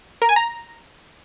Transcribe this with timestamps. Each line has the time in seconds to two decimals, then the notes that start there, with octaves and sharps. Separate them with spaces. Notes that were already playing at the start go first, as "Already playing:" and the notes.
0.22 A#4
0.29 G#5
0.36 A#5